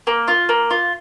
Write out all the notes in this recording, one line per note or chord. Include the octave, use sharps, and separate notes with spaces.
A#3
F4
A#3
F4